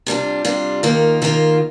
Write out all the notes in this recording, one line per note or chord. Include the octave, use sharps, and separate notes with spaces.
C3 G3 D4 F4
C3 G3 D4 F4
D#2 D#3 A#3 F4
D#2 D#3 A#3 F4